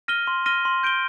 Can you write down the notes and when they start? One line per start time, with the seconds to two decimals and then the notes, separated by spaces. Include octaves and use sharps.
0.08 F6 A#6 D#7 G7
0.27 C6
0.46 F6 A#6 D#7 G7
0.65 C6
0.83 G6 D7 G7